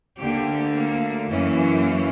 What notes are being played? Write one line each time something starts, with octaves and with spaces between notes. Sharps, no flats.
D2 D3 A#3 G4
A#3
F#2 E3 A#3 C#4